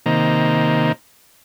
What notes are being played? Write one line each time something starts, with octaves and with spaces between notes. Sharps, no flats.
C3 D#3 A#3